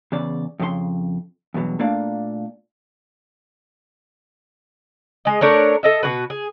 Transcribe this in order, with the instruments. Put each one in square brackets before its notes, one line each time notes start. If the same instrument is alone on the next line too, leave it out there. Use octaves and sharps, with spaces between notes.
[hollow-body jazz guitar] E2 C#3 D5
F2 C#3 G4 C6
E2 G2 B2 F#3
A#2 A3 A#3 D4 D5 F5
[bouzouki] G#3 D#5
A3 D4 A#4 C#5
A4 D#5 E5
B2 F#3 F#4 B4
G#4